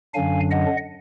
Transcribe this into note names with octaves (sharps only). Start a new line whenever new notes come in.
F#2 D3 F#3 D4 F5 G#5
D#5 F#5